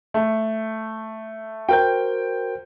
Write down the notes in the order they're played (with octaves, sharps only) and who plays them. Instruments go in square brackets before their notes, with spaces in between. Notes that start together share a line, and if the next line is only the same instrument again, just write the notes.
[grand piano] A3
[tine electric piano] F#4 A#4 C5 [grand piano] G5 G6